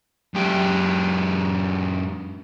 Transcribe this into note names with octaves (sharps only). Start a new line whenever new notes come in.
F#2 G4